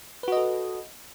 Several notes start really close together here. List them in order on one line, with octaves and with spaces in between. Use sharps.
B4 F#4 D#5 A4